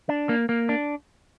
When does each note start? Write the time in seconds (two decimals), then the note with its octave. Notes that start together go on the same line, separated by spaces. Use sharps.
0.09 D4
0.29 A#3
0.49 A#3
0.69 D4